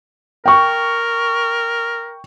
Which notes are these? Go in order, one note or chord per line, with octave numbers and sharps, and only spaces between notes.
A#4 G5 C#6